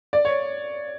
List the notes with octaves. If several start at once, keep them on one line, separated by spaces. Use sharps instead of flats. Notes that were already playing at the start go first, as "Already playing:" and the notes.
D5
C#5